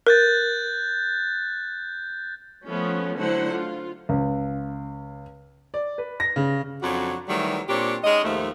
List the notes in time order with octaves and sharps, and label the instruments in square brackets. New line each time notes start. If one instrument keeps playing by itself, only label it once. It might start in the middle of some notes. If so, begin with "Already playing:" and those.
[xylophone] A#4 [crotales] F#6 G6 A6
[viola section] F3 A3 B3 C#4
D3 F#3 A3 E4 C5 F#5
F4
[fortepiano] C#2
[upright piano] D5
B4
A#6
C#3
[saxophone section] F2 F#3 D4 F#4
D#3 E3 F#3 G3 A3
A#2 C4 D4 G4 C#5
G#3 C#4 D#4 D#5
D#2 G#2 F3 A3